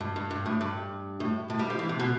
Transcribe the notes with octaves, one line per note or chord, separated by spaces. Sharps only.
G2
G2
G2
A2
G2
A2
A2
G3
F3
E3
C3
B2